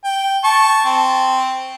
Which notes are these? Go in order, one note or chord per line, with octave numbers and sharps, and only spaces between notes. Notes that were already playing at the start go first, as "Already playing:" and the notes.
G5
A5 C#6
C4